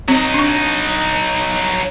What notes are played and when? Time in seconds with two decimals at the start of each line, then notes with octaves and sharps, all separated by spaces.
0.08 F#3 C4 D#4
0.34 D4 C#6